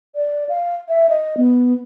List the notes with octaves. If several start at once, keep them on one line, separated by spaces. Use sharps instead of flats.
D5
F5
E5
D#5
B3